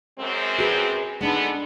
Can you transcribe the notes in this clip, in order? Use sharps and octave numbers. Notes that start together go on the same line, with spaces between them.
F#2 G#3 C4
F#4 G#4 B4
D3 G#3 B3 D4 D#4